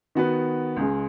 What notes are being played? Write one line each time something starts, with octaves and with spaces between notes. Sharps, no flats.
D#3 B3 F#4 B4
C#2 C#3 G#3